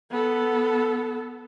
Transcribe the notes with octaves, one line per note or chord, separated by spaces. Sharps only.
B3 A4